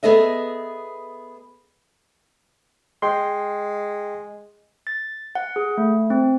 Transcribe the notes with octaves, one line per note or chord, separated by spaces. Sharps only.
B3 G#4 A4 D#5 E5
G#3 G5 C6
A6
F#5
G#4
A3
C4